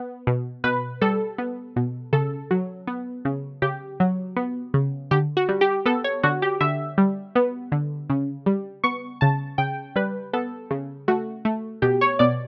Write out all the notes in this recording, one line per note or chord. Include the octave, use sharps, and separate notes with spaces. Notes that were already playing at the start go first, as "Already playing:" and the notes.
Already playing: B3
B2
B2 B4
G3 A4
B3
B2
C#3 A4
F#3
B3
C#3
C#3 G4
F#3
B3
C#3
D3 G4
F#4
G3
G4
B3 A4
C#5
D3 F#4
G4
D3 E5
G3
B3
D3
C#3
G3
B3 C#6
C#3 A5
C#3 G5
G3 B4
B3 A4
C#3
A3 F#4
A3
B2 G4
C#5
B2 D5